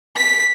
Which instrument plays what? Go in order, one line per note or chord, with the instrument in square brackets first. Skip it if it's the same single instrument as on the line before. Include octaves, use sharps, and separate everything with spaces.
[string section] B6